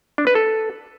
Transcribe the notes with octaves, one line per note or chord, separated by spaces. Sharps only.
D4
B4
A4